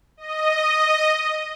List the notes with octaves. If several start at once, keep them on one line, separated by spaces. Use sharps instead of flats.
D#5